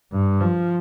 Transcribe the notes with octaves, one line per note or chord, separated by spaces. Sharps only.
G2
F3